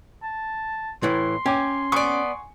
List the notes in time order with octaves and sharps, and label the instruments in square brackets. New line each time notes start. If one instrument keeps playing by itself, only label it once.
[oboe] A5
[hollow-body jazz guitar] A2 E3 [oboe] C6
[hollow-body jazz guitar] C#4 [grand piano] G5 G#5 D6
[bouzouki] B3 D5 [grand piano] F#5 G#5 C#6